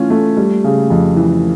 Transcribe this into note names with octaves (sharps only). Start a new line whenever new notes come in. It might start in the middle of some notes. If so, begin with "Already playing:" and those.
Already playing: E3 A3 C#4 F4
A3
G3
C#3
F2
E3